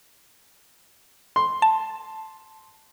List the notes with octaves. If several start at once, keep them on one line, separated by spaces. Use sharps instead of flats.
C6
A5